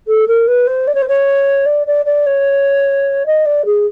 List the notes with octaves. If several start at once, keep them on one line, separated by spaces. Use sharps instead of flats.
A4
A#4
B4
C5
D5
C#5
C5
C#5
D5
D5
D5
C#5
D#5
D5
G#4